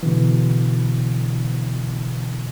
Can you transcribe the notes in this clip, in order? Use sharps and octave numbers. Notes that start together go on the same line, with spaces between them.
B2 D3 E3